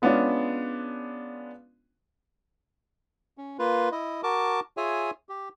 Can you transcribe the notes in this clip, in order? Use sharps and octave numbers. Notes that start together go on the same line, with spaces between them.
G#3 B3 C#4 D4 F4
C#4
A#3 F4 B4
E4 D#5
F#4 A#4 A5 D6
F4 G#4 C#5 E5 G#5
G4